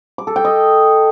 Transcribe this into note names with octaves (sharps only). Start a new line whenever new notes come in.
D6
A4
G5
D#5